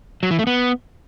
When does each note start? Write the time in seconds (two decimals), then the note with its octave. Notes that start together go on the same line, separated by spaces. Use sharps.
0.23 F#3
0.31 E3
0.39 A3
0.47 B3